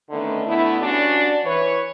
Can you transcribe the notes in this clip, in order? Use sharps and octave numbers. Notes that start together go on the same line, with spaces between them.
D3 D#3 A3 B3 C#4 D#4
D3 A3 B3 E4
G2 C#4 D4 F#4 D5
E3 B4 C#5